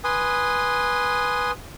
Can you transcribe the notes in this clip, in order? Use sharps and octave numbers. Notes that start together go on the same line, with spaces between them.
B4 G#5 C6 D#6